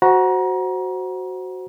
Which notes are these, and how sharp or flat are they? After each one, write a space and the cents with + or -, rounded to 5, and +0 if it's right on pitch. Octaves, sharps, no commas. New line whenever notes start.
F#4 +0 C5 +0 A#5 +30